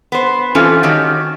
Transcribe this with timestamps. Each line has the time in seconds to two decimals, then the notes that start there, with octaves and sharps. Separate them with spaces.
0.12 B3 C5
0.55 E3 G3 C4 C#4 F4 A4
0.83 D#3 C#4 F#4 G4 C#5